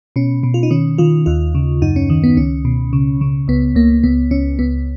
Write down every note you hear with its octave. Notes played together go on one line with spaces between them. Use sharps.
B2 C#4
B2
F4
D#4
D#3 C#4
D#3 F4
D#2 F4
C#3
F#2 D#4
C#4
D#3
B3
C#2 C#4
B2
C#3
C#3
C#2 B3
C#2 A#3
C#2 B3
C#2 C#4
C#2 B3